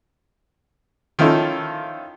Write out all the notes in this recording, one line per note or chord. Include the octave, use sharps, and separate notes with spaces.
D#3 F3 C#4 E4 F4 A4